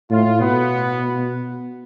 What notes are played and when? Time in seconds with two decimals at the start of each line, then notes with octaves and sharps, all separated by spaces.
0.11 A2 F4
0.41 B2 B3